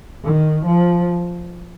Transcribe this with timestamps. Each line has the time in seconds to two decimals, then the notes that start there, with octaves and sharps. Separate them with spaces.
0.24 D#3
0.66 F3